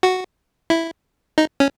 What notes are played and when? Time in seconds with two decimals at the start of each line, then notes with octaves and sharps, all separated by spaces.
0.03 F#4
0.70 E4
1.38 D#4
1.60 C#4